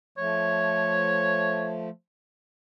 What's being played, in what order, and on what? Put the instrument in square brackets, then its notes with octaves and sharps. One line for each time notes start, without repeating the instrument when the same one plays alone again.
[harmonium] F3 A3 [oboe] C#5